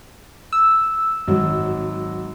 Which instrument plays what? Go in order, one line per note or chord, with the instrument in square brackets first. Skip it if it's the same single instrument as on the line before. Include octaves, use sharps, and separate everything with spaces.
[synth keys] E6
[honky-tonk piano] G#1 F#3